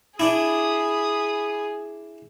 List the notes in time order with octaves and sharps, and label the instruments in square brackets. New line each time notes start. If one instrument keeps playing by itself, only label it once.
[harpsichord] D4 E4 [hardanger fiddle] G#4 [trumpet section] B5 D#6